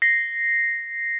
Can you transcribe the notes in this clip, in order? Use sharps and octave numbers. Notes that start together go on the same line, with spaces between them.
A#6 C7